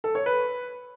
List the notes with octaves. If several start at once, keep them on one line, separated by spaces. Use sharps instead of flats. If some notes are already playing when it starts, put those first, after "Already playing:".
A4
C#5
B4